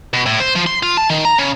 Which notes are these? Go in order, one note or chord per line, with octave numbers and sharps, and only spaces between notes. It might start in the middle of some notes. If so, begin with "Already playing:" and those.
B2
A2
C5
F3
C6
F4
A5
D#3
A#5
C#3